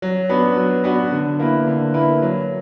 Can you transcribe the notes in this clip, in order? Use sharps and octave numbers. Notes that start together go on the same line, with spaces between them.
F#3
B3 D4 F#4 B4
F#3
B3 D4 F#4 B4
D3
A#3 E4 B4
D3
A#3 E4 B4
F#3